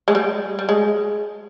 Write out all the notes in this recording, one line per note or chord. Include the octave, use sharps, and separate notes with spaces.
G#3
G3
G3
G#3